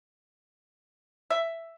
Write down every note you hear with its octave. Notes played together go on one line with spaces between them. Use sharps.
E5